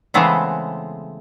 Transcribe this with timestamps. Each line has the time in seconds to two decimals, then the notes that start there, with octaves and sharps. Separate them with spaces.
0.14 C#3 E3 G#3 A3 B3 C4